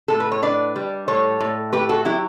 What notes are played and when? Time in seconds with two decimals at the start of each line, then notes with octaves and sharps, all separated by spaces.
0.08 A2 A4
0.20 B4
0.32 C#5
0.42 D4 B4 D5
0.76 G3
1.08 A2 A4 C#5
1.40 A2
1.72 A3 G4 B4
1.89 F#4 A4
2.05 F#3 E4 G4